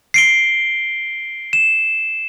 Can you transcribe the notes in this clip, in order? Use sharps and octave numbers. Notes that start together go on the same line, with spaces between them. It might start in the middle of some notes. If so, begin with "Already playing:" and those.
C7 D7 G7
E7